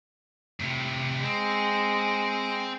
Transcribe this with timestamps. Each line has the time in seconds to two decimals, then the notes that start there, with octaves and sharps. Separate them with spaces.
0.60 A2 C3
1.24 G#3 C4